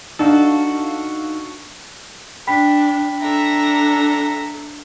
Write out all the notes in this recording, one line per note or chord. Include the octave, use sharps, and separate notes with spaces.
D4 D#4 F#4 A4 F5
D4 G5 B5 B6
D4 A4 E5 A#5